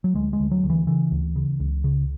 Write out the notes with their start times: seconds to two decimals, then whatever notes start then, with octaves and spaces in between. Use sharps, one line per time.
0.04 F#3
0.15 D2 G#3
0.33 G#3
0.40 D2
0.51 F#3
0.64 D2
0.70 E3
0.87 C#3 E3
1.12 D2
1.36 C#3
1.60 C#2
1.84 C#3